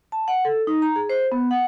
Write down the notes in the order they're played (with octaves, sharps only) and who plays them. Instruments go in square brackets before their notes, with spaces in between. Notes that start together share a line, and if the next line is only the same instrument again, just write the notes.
[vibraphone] A5
F#5
A4
D#4
A#5
G#4
C5
B3
F#5